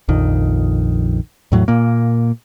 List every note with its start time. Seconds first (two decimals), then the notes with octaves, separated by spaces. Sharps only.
0.09 A#1 F2 D#3
1.52 E2 A2 F#3
1.68 A#2 A#3